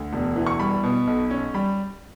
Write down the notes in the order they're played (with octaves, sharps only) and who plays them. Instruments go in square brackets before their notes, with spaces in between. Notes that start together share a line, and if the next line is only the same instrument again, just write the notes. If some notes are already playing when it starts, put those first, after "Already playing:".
Already playing: [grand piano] D2
E1
E3
C#6
G3 B5
B2
B1
C#4
G3 B5